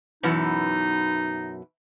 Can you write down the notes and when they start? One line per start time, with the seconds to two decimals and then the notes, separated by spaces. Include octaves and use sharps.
0.23 F#2 B2 E3 D#4